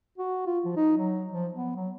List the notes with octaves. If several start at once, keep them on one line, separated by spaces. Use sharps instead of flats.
F#4
F4
F3
D#4
F#3
F3
B3
F#3